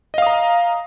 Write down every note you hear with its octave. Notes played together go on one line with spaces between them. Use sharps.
D#5 F5 A#5 D#6